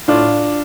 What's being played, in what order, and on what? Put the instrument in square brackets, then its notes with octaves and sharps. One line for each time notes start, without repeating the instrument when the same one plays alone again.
[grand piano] A2 D4 F4